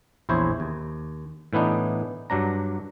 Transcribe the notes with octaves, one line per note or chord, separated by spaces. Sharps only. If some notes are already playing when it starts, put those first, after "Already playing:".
A#1 E2 E4 C5 C#5
D#2
A2 E3 B3 D4 D#4
G2 F#3 D4 A#5